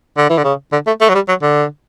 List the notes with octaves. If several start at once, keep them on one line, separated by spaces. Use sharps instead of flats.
D3
E3
D3
C#3
D3
A3
A3
F#3
G3
F#3
D3